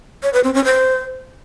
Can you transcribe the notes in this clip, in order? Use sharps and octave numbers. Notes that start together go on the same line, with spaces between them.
C#5
B4
C4
C#4
C5